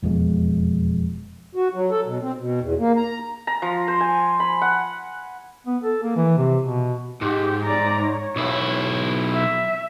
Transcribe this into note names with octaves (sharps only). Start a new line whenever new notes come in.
E1 F2 B2 G#3
F#4
F#3
A4
B2
C4
B2
E2
A#3
A#5
A#5
F3
C5
G#5
B5
F#5
B3
A4
A#3
E3
C3
B2
G#2 G4
D5 A#5
C#5
B1 E4
E5